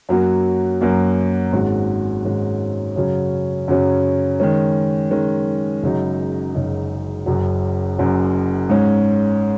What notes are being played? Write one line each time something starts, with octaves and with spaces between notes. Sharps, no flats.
F#2 F#3 A#3 F#4
F#2 F#3 A#3 F#4
G#1 G#2 G#3 C#4 F#4
G#1 G#2 G#3 C#4 F#4
F#2 C#3 F#3 C#4
F#2 C#3 F#3 C#4
D#3 G#3 C#4
D#3 G#3 C#4
F#1 F#2 C#3 F#3 D#4
F#1 F#2 C#3 F#3 D#4
F#1 F#2 F#3
F#1 F#2 F#3
G#2 G#3 C#4